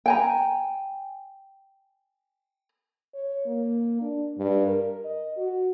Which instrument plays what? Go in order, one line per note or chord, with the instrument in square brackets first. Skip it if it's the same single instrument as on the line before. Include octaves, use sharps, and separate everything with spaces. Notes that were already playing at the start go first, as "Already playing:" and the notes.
[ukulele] G5 G#5 A#5
[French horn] C#5
A#3
D4
G2
A#4
D#5
F#4